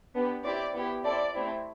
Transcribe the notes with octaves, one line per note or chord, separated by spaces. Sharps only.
B3 D4 G4
C4 E4 G4 D5
B3 E4 G4
C4 E4 A4 D5
A3 C4 E4 G4